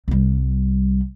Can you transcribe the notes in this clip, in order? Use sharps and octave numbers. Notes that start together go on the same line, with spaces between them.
C2 G3